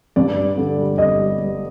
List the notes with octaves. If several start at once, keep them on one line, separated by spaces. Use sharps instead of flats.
G2 D5
G3
D3
G3
G1 D#5
G3
G3